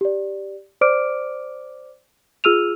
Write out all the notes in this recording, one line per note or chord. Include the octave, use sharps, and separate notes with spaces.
G4 D5
C5 D5 D6 F6 D7
F4 G#4 E6 F6 D#7 F7